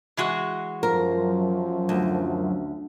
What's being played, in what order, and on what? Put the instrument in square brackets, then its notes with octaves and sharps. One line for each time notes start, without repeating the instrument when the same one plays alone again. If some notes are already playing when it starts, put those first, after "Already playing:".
[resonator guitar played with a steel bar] E3 G#3 F#4
[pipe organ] F#2 [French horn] F3 [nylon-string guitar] A#4
[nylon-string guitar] D2